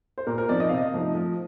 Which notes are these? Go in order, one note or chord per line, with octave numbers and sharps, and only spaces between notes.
C5
A#2 A#4
A#4
F3 C4 D#4 D5
D#5
C3 F5
D#5
F3 A3 D#4
F3